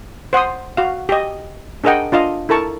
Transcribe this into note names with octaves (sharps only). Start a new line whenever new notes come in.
C5 F#5 C6 D#6
F#4 F5
G4 D#5
D4 G#4 A#4 D#5 F#5 G5
D4 F4 D#5 F5
E4 A4 A#4 A5 C#6